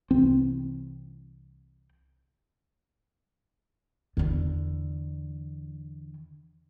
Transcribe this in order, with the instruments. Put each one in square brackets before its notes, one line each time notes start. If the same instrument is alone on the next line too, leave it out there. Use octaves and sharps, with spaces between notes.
[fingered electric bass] C2 E3 C4
[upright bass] E2 D3